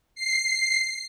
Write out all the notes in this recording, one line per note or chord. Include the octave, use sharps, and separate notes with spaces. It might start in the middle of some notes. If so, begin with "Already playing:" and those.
C7